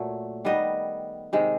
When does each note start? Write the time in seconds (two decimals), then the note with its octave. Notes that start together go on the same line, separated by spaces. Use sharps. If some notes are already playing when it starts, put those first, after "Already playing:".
Already playing: A#2 F#3 A3
0.45 D#3 G3 B3 D#5
1.33 C3 D#3 G#3